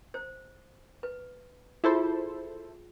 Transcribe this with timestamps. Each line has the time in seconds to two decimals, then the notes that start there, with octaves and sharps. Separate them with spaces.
0.14 C5
1.03 B4
1.84 E4 F4 G#4 A4 C5